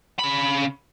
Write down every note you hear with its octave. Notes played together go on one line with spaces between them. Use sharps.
C#3 B5